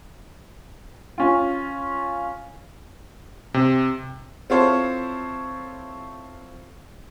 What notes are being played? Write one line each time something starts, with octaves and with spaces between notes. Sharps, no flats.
C#4 F4
C3
C4 E4 F4 A4 C5 C#5